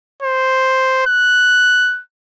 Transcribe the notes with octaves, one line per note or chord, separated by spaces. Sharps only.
C5
F#6